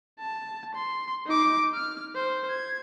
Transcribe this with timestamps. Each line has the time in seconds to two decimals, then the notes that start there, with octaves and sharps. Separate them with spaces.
0.19 A5
0.75 C6
1.26 D#4 D6
1.75 F6
2.16 C5
2.50 G#6